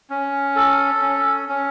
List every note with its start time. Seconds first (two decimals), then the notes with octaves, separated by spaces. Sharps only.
0.10 C#4
0.56 A4
1.02 C#4
1.49 C#4